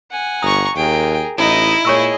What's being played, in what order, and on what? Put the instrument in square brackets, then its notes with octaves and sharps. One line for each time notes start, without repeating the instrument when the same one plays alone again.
[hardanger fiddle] F#5 G#5
[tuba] G1 [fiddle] A#5 C#6 [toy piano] D#6
[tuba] D#2 [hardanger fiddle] G#4 A#4 [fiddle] G5
[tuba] A1 [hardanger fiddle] D#4 D#5 [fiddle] E4
[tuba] A#2 [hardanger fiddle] G#4 D#5 [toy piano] C#5 C#6 E6